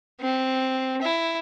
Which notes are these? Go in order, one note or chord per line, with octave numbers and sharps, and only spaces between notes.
C4
E4